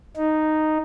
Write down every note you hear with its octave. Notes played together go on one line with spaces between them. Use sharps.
D#4